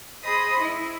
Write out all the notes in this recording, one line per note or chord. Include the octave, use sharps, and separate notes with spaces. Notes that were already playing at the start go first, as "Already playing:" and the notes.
G#4 C5 D#5 B5 C6 D#6
E4